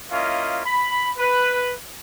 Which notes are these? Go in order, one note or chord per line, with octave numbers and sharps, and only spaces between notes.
A#3 C#4 E4 F4 D#5
B5
B4